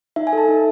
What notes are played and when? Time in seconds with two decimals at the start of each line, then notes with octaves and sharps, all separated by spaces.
0.16 D#4 E5
0.27 G#5
0.33 A4 A5
0.48 D#4